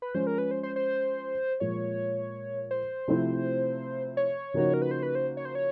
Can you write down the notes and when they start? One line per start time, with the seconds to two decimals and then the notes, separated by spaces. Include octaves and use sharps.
0.02 B4
0.14 F3 G#3 C#4 C5
0.27 A#4
0.38 B4
0.51 C5
0.63 C5
0.76 C5
1.60 A#2 F3 G#3 C#5
2.71 C5
3.08 C3 F3 A3 C4 E4
4.17 C#5
4.54 C#3 F3 A#3 D#4 F#4
4.74 A#4
4.82 B4
4.91 C5
5.03 B4
5.15 C5
5.37 C#5
5.45 C5
5.55 C#5